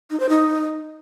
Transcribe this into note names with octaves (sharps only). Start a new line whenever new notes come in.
D#4
C5
D#4